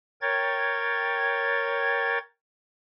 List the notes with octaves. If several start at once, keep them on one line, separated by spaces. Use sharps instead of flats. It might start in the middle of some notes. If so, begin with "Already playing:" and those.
A#4 C#5 G5 G#6 A6